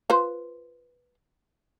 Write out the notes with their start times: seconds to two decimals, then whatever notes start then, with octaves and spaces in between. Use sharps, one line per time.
0.10 F4 B4 C5